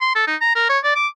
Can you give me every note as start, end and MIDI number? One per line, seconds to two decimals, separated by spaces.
0.01 0.15 84
0.16 0.26 69
0.28 0.36 63
0.41 0.55 82
0.56 0.65 70
0.69 0.79 73
0.84 0.94 74
0.96 1.07 86